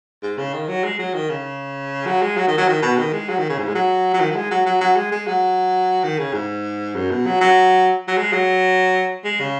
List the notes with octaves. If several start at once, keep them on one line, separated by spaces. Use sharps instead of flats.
G#2
C#3
D#3
F#3
G#3
F#3
D#3
C#3
F#3
G#3
F#3
D#3
F#3
D#3
B2
D#3
G#3
F#3
D#3
C#3
G#2
G#3
F#3
F#3
D#3
F#3
G#3
F#3
F#3
F#3
G#3
G#3
F#3
D#3
C#3
G#2
F#2
B2
F#3
F#3
F#3
G#3
F#3
G#3
C#3